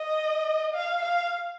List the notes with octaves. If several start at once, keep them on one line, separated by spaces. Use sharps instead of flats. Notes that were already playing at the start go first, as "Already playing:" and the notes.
Already playing: D#5
F5
F5